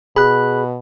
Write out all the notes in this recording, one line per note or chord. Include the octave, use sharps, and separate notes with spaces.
B2 G#4 B5 F#6